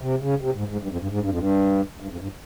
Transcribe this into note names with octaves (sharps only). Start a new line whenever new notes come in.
C3
C#3
C3
G#2
G#2
G2
F2
G2
G#2
G2
F2
G2
G2
F2
G2